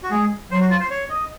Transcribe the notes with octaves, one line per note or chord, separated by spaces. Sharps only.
F#4
G#3 G#4
F#3 C5
F#4
F4
C5
C#5
D#5